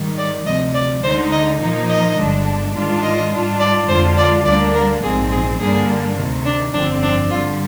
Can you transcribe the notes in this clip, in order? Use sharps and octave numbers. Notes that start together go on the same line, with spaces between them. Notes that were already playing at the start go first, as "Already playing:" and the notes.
Already playing: G#2 D#3 G3
D5
D2 C3 F3 D#5
D5
D2 D3 G#3 D#4 C5
D#5
A#2 F3 A#3 D#4
D#5
G1 G2 D3 G#3 D4
G#2 D#3 G#3 D4 F4
D#5
G#2 G3 D4 F4
D5
F2 D3 G#3 D4 F4 C5
D5
D2 D3 G3 A#3 D4 D5
A#4
A#1 G#2 F3 C4 G#4
G#4
G2 D3 G3 A#3 D4 G#4
D2 C3 D#3
D4
G1 F2 D3 F3 C4 D4
D4
G2 D3 G3 F4